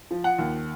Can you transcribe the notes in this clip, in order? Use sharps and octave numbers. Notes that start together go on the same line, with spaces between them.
F3
F#5
D#2